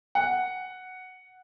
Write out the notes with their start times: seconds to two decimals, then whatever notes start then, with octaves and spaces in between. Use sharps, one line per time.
0.15 F#5